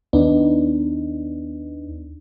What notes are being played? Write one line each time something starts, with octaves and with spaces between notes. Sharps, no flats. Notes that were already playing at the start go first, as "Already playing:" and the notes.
D#2 B3 D4 D#4